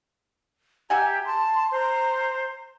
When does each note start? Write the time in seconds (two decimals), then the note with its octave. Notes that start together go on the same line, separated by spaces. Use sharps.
0.90 G4 E5 F#5 G#5 A#5
1.26 A5 C6
1.72 C5 A#5